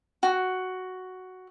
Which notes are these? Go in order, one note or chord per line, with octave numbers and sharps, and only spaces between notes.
F#4